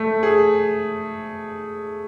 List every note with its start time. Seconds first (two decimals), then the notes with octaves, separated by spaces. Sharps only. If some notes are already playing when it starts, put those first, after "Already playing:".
Already playing: A3
0.23 G#4